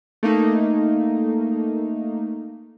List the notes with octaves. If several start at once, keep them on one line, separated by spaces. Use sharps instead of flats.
A3 A#3 D#4